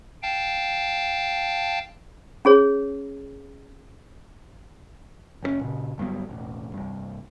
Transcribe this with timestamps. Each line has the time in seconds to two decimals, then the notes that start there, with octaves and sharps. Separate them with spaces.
0.23 F5 G5 A5
2.45 C#4 G#4 C#5
5.43 F#1 C#3 C#4
5.61 A#2 C#3
5.98 G1 G2 F#3 B3
6.29 E1 A1
6.74 C2 G2